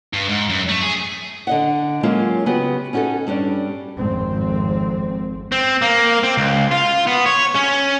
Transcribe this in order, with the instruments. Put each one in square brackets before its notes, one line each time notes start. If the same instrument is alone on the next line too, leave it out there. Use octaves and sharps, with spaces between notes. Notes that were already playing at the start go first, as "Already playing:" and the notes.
[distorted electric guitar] G2
G#2
F#2
A3
G#4
[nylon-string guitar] D3 D#5 F#5
F#3 G#3 A#3 C#4 F4
C#3 B3 F#4 G4
C#4 D#4 F#4 G#4 A4
G2 G3 C#4 D4
[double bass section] G#1 F2 C4
[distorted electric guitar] C4
A#3
C4
C#2
F4
B3
C#5
C#4